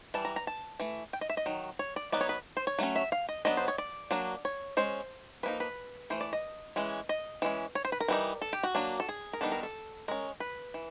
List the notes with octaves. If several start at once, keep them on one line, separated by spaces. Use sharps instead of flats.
E3 G3 A5
A#5
A#5
A5
E3 A3
G5
D#5
E5
D#5
D#3 F#3
C#5
D5
F#3 B3 D#4 D5
C#5
B4
C5
C#5
F#3 A3 C#4
E5
F5
D#5
F#3 B3 D4 D#5
C5
C#5
D5
F#3 A#3 D4
C#5
G#3 C#4 C5
F3 A#3 D#4 B4
B4
E3 A3 C5
D5
D#5
E3 G#3 C#4
D#5
E3 G#3 C#4
C#5
C5
B4
A#4
E3 G3 B3 D#4
A4
G4
F#4
F#3 A#3 D4
A4
G#4
A#4
D#3 G3 B3 D4 A4
A#4
A4
G#3 C#4 A#4
B4
E3